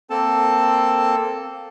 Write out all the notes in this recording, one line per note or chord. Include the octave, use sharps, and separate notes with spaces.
A#3 C4 A4 A5